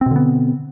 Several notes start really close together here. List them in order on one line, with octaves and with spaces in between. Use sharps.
C4 B2 D3 B3